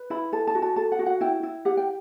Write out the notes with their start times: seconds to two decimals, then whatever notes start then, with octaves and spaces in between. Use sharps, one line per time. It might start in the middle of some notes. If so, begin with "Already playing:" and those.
Already playing: B4
0.10 E4 B5
0.32 A4 A5
0.47 A5
0.55 F#4
0.62 A5
0.76 A4 A5
0.92 F#5
0.99 F#4
1.06 F#5
1.21 E4 G5
1.43 E4
1.65 G4 F#5
1.77 G5